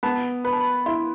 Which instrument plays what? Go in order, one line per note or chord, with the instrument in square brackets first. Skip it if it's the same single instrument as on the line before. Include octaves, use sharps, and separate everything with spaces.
[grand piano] B3 [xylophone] A5
[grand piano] B4 [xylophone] B5
[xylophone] A5
B5
[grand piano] E4 [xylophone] C6